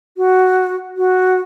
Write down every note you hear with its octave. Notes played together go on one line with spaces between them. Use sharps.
F#4
F#4